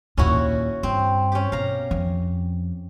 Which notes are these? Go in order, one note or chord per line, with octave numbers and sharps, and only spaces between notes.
D#2 A#2 C#4 E4 F#4
G2 C4
C#4 G4
B2 F5 A#5
F2